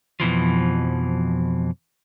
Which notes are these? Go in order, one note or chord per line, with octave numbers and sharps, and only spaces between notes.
F2 B2 E3 F3